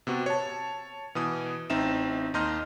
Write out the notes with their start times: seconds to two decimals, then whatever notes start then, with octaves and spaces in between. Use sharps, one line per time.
0.07 C3 B3 F#4
0.26 C#5 A5
1.15 B2 E3 D#6
1.70 A1 C4 D#4 E5 E7
2.34 D#2 D#4 D#5 C6 F6 G6